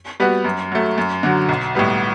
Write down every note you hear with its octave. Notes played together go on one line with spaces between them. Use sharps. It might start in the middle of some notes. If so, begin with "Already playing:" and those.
G3 B3 F#4
F#2
F#3 A3
F#2
D3 F#3
B1
A2 G3 B3